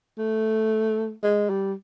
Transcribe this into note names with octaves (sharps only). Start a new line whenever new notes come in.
A3
G#3
G3